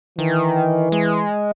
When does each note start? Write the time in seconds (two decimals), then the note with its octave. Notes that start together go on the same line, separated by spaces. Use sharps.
0.19 D#3 E3
0.92 G#3